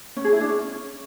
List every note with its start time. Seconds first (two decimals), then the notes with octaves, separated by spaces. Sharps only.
0.17 C#4
0.25 G#4
0.33 E4
0.41 D4
0.49 C#4